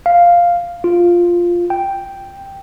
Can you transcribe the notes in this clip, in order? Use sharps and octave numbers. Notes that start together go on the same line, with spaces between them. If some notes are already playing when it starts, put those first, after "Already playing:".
F5
F4
G5